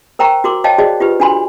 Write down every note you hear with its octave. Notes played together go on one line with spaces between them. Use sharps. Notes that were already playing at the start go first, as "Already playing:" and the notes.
A#4 C5 G5 A#5 C#6
F#4 A#4 C6 D6
C5 C#5 D#5 F5 G5 A5
F#4 G#4 C5 D5 D#5
F4 G4 B4
D4 F#4 G#5 B5 C6